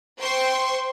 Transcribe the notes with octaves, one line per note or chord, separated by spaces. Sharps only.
C5 G5 C6 C#6